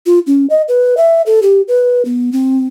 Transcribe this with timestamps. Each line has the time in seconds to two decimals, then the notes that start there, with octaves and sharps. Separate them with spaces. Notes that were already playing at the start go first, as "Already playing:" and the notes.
0.06 F4
0.27 C#4
0.50 D#5
0.68 B4
0.97 E5
1.26 A4
1.42 G4
1.68 B4
2.05 B3
2.32 C4